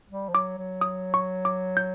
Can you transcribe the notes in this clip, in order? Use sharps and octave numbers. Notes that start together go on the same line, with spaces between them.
G3
F3
F#3 D6
F#3
D#6
C#6
D6
G6